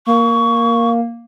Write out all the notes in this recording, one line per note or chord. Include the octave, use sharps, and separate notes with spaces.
A#3 C#6